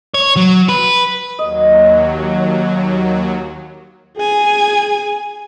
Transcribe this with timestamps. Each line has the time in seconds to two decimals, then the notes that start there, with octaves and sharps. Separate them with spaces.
0.14 C#5
0.37 F#3
0.69 B4
1.39 D#2 F#3 D#5
4.17 G#4 G#5